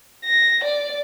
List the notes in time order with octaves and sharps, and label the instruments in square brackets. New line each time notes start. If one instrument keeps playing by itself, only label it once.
[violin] A#6
D5